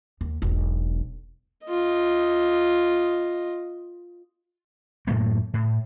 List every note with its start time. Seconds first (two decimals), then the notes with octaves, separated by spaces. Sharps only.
0.21 D#2
0.42 E1 B1
1.67 F4 D#5
5.07 F#2 A2 A3 A#3
5.54 A2